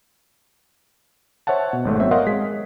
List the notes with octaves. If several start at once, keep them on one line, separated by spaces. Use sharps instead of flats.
C5 C#5 E5 F#5 A5
B2
G#1 G#2 A3
F#3 B3 C4 C5 C#5 E5
A#4 C#5 D#5 F5 F#5 C6
G#3 G#4 B6